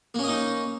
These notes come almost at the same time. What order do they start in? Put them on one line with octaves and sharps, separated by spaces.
A#3 C#4 D#5 D#4